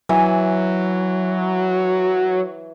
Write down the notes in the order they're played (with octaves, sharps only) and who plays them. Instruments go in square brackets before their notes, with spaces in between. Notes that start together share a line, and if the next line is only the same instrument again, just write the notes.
[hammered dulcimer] E3 [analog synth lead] F#3